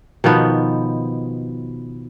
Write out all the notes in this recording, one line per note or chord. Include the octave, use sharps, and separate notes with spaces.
B2 D#3 F3 B3